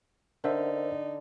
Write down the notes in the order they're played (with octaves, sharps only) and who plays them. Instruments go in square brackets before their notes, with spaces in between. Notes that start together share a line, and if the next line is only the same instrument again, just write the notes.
[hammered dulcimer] D3 [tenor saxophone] D#4 [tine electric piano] A#4 C5 E5